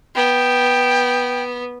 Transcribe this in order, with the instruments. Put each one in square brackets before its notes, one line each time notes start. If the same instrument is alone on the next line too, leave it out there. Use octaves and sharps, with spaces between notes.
[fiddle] B3 [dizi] G5